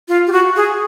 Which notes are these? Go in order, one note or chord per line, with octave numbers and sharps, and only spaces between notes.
F4
G4
F#4
G#4